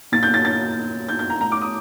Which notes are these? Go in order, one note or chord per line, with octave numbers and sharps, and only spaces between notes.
A#2 A6
G6
A6
A6
G6
G6
A#5
A2 A#5
D6
D#6